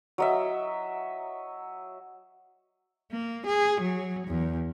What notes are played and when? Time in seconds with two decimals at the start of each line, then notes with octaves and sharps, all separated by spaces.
0.18 F#3 D#5 E5
3.12 A#3
3.47 G#4
3.81 F#3
4.28 E2